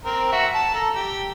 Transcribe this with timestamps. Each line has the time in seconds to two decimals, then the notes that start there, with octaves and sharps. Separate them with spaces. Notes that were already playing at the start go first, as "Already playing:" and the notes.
0.05 C4 A#4
0.32 F#4 E5
0.54 A5
0.74 A4 A#5
0.95 G4